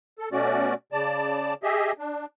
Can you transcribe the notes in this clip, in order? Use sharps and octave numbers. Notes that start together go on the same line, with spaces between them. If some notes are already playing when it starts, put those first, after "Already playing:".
A4
B2 A3 C#4 F#4 D5
C#3 D5 A5
G4 G#4 D#5 E5
D4